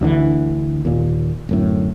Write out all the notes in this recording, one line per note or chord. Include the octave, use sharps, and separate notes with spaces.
D2 D3 E3
D#2 A#2
D1 F#2 A2